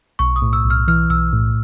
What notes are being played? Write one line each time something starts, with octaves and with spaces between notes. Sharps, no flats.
B1 C#6
D#6
A2
E6
B1
F6
E3 F6
B1 E6
A2